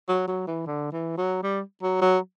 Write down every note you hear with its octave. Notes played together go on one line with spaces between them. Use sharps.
F#3
F#3
E3
D3
E3
F#3
G3
F#3
F#3